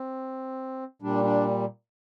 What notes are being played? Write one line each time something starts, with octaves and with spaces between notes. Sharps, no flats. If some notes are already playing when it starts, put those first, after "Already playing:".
Already playing: C4
A#2 G3 D4
D4